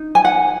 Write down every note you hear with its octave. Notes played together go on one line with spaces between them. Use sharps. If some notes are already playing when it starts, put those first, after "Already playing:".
Already playing: D#4
G#5
F#5